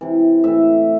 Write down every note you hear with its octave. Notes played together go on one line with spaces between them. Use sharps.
C3 E3
A2 E3 E5